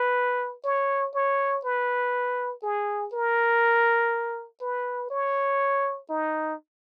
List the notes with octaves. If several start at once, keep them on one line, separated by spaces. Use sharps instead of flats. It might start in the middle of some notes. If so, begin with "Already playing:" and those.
Already playing: B4
C#5
C#5
B4
G#4
A#4
B4
C#5
D#4